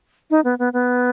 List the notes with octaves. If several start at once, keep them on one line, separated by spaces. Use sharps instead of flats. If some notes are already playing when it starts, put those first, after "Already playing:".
D#4
B3
B3
B3